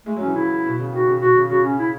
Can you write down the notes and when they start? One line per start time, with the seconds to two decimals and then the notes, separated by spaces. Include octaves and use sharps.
0.06 G#3 A3
0.16 F#3
0.21 E3 C#4
0.34 C#3 E4
0.66 B2
0.79 C#3
0.92 D#3 F#4
1.07 C#3
1.21 B2 F#4
1.35 C#3
1.50 C#3 F#4
1.64 C#4
1.79 E4